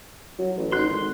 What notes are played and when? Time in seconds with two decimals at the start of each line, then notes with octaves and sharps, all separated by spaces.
0.39 F#3
0.57 A1
0.72 D#4 F#4 C6 F#6
0.89 G#1